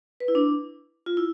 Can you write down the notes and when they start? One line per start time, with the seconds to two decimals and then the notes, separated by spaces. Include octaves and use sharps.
0.20 B4
0.28 E4
0.35 D4
1.06 F4
1.17 E4